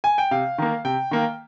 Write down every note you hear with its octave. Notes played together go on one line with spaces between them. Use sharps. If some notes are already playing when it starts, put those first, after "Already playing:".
G#5
G5
C3 F5
D#3 A#3
C3 G5
D#3 A#3